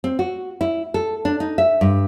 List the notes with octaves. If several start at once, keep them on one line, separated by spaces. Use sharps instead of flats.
C4
F#4
E4
A4
D4
D#4
E5
G2